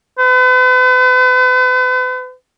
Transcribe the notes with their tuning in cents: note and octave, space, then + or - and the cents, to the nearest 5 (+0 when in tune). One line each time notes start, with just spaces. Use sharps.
B4 +40